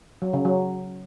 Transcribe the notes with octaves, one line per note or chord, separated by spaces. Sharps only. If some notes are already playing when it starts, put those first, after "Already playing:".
F#3
C#3
F#3